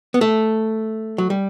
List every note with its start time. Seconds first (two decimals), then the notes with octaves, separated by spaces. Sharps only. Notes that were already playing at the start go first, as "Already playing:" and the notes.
0.14 B3
0.21 A3
1.18 F#3
1.30 G3